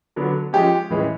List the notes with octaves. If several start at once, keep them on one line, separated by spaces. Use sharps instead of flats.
D3 F#3 B3 D4
F3 G#3 C#4 G4
A2 E3 G#3 C#4